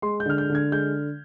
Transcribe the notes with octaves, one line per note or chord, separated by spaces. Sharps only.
G#3 C6
G6
D3 F6
G6
D3
G#6
G#3 G6